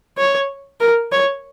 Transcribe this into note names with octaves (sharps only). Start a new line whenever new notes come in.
C#5
A#4
C#5